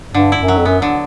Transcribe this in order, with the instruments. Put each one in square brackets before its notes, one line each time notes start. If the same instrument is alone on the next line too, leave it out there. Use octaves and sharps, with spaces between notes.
[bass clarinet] G2 [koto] D3
[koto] E4
[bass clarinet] F#2
[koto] F#3
[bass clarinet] F2
[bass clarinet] F#2 [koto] B3
[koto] D3